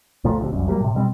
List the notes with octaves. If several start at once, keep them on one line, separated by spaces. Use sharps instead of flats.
C#2 A#2 F3 A3
D2 C3
F1 C2 F#2
F#3 G3 A3 A#3
A2 C3
B2 G3 C4